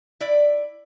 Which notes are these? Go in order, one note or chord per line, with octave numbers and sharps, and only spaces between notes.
E4 D5